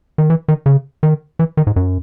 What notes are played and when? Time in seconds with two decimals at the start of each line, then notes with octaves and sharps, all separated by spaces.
0.18 D#3
0.30 E3
0.48 D#3
0.66 C#3
1.03 D#3
1.39 E3
1.57 D#3
1.67 G#2
1.76 F#2